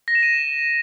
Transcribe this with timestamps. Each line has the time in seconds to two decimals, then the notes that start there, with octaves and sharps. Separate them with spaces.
0.08 A#6
0.15 E7
0.23 D#7